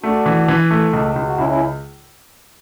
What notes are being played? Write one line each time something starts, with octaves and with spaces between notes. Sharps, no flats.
A3 D4 F#4
E3
E3
A3
C#2
C#2
F#4
C#2 C#4 E4
C#4 E4